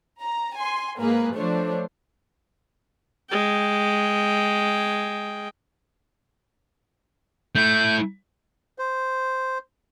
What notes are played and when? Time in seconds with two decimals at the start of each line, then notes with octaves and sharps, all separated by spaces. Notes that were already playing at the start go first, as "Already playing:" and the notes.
0.19 A#5
0.55 G#5 C6
0.98 G#2 A#3 G#4 B4
1.35 F3 A3 D4 C5 C#5
3.30 G#3 G5
7.55 A3 E4 G6
8.79 C5